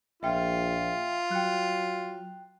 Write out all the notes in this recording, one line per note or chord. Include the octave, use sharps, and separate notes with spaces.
A#1 F4 E5 G5
F#3 G5 F#6